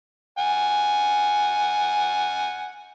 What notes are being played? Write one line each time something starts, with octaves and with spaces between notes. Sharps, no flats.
F#5 G#5